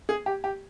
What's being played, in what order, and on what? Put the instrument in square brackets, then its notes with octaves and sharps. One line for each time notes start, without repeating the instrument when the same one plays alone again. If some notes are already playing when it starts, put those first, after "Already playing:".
[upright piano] G#4
G4
G4